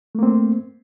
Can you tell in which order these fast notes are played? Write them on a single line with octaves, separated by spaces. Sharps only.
A3 A#3 C4